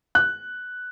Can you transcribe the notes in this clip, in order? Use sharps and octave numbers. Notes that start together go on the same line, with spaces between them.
F#6